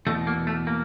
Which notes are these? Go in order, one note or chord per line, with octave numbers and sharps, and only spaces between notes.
E2 B2 A3
A#3
A3
A#3